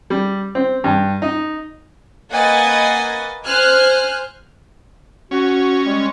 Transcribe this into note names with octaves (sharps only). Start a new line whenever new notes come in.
G3
C4
G2
D#4
A#3 B4 D#5 F#5 G#5 A6
C5 G#5 F6 F#6
C#4 F#4
G3 G#3